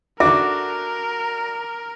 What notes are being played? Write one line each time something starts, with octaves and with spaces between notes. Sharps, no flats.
D3 D4 F#4 A#4 E5 D6